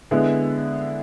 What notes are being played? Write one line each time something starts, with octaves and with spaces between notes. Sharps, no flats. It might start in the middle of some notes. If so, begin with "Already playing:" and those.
D3 G#3 B3 E4